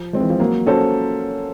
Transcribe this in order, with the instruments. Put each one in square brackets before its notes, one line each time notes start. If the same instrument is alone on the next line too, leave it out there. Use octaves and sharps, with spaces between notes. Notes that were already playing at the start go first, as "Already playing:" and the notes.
Already playing: [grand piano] F3
[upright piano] G#3 C4
[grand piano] E3
F3
[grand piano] F#3 [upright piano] A#3
[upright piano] C#4 F#4 A4 C5